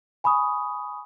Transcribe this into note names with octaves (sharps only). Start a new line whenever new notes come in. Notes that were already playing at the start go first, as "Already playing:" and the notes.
G#5 B5 C#6 D#6